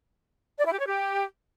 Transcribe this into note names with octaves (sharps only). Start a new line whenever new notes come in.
D5
E4
G4
C#5
G4